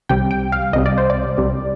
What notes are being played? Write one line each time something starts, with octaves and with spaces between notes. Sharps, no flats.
C2 C3 G3 G5
G5
F5
C2 C3 G3 D#5
D5
C5
D5
C2 C3 G3